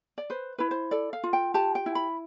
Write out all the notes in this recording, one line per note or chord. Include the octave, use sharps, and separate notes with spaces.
D5
B4 C5
E4 B4
C5
A4 D5
F5
F4
G5
G4 A5
G5
E4
B5